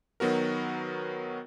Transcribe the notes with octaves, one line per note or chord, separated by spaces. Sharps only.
D#3 F#3 B3 F#4 A#4